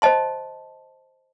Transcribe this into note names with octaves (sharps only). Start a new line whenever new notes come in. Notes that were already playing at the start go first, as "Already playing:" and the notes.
C5 D#5 A5 C6